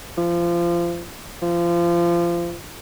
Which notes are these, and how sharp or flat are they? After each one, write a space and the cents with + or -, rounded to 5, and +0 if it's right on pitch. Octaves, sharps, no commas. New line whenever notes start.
F3 -25
F3 -25